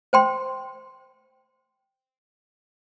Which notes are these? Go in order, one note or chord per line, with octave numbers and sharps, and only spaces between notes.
C5 G5 C6